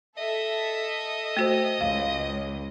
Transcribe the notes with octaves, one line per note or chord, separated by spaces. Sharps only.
A4 D#5 E5
A3 F#4 C5
C#2 F5